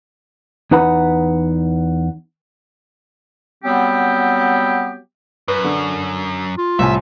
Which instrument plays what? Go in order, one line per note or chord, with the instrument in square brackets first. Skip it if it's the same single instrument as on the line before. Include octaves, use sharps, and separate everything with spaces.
[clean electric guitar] E2 D#4 B4 F#5 A#5 B5
[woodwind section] F#3 G3 B3 C4 G4
[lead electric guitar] F#2 [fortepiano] B4
[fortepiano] D3
[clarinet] F4
[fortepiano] C2 A2 G#5 [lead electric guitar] E5